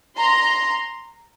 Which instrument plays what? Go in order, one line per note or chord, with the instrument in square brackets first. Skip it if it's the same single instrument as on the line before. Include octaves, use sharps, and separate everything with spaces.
[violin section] A#5 C6